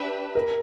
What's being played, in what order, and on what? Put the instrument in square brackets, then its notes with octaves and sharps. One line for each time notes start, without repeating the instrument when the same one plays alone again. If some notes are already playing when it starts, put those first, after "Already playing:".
Already playing: [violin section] D4 G4 B4 E5
[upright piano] A#4